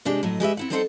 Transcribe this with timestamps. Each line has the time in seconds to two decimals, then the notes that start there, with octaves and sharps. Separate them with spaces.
0.05 C3 G#3 D4 G4
0.23 A2 F#3 D#5
0.40 G#3 G4 B4 E5
0.57 C4 E4 F#5
0.70 G3 C4 D#4 A4 C5 F#5